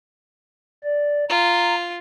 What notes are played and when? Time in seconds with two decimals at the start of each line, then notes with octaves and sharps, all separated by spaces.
0.84 D5
1.30 F4 A#5